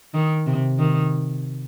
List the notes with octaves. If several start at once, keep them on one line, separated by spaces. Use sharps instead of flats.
D#3
C3
D#3